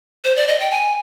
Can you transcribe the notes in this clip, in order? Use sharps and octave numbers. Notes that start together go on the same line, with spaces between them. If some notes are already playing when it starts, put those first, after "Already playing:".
C5
D5
D#5
G5
G#5